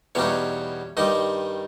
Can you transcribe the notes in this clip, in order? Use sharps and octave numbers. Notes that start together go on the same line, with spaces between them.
E2 B2 G3 B3 C#4 D#4 C#5
G2 D#3 G3 D#4 D#5